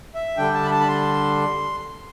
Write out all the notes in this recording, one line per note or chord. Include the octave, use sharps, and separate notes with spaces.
E5
D3 G3 D4 G5
A5
B5
A5
B5
C6